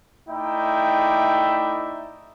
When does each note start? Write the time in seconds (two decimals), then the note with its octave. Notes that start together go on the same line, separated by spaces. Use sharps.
0.28 A3 D#4 E4 D5 E5 G5